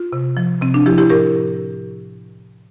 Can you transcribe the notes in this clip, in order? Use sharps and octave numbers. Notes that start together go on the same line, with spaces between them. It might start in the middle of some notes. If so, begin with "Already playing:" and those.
Already playing: F4
C3
F3
C3 C4
D4
F3 E4 G4
E4 G4
A2 G4 A#4